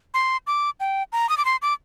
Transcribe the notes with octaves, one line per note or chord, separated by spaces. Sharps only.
C6
D6
G5
A#5
D#6
D6
C6
D6